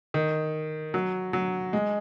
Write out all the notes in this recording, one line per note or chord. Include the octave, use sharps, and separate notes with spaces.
D#3
F#3
F#3
G#3